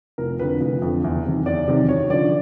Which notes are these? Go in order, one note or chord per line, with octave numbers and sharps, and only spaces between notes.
F1 A#4
F2 D3 B4
F1
F2 D3
E2
C3 D#3
E2 D5
C3 D#3
F#2 C#5
D3 F3 D5